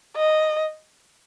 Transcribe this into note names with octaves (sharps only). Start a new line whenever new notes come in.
D#5